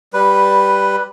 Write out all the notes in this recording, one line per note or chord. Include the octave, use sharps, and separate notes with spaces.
G3 B4